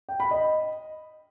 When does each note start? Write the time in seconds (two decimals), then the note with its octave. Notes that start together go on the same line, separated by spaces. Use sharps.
0.09 G5
0.20 B5
0.31 D#5